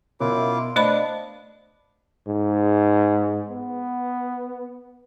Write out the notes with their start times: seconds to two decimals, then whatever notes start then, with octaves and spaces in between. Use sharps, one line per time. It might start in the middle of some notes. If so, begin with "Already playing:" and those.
0.20 F#2 B2 E4 F4 D6
0.76 A3 D4 B4 C5 D#5 B5
2.28 G#2
3.49 B3